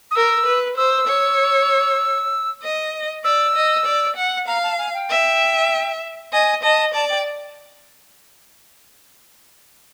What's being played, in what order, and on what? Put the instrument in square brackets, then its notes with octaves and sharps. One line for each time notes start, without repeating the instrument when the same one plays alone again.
[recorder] D#6
[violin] A#4 [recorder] E6
[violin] B4
[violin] C5 [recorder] E6
[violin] C#5
D#5
[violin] D5 [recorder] E6
[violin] D#5
D5
F#5
[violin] F5 [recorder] A#5
[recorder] A5
G#5
G5
[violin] E5
[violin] D#5 [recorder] G#5
[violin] D#5 [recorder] A5
[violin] D5 [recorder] A5
[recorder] G5